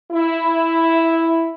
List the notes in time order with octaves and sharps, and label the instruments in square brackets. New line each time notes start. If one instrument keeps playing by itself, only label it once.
[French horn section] E4